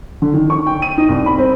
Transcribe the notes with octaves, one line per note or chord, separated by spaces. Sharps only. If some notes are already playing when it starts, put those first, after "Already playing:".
D3
D#3
C#6
G5
D#7
D#4
C2
B5
C4